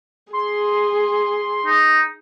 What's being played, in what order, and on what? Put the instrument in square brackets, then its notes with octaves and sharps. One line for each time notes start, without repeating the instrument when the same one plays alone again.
[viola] G#4 [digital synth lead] C6
[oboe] D#4